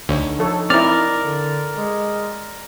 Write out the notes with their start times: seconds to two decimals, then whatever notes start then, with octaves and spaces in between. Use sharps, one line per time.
0.09 D2 D4 D#4 C#5
0.39 F3 A4 C#5
0.70 C4 E4 A#4 D5 F6
1.23 D3
1.77 G#3